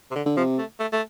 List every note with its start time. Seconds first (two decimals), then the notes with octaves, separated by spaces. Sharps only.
0.11 C3
0.16 D3
0.26 D3
0.36 C3 F3
0.58 A3
0.79 A3
0.92 A3